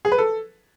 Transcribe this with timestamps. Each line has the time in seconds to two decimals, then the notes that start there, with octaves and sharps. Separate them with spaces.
0.05 G#4
0.12 B4
0.18 A4